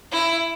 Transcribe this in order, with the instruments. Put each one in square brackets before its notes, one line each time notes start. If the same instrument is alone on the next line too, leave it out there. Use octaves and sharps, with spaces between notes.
[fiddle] E4